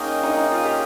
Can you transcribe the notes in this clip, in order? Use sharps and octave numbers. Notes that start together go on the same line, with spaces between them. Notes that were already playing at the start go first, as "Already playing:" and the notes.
Already playing: A#3 C#4 D#4 G#4 D#5 G5
D#4
D#4
F4
G4